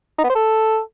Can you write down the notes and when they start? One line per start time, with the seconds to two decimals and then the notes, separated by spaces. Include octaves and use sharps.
0.18 D#4
0.24 B3
0.30 C5
0.35 A4